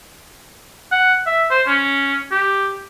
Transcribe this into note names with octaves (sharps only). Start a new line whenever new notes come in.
F#5
E5
C5
C#4
G4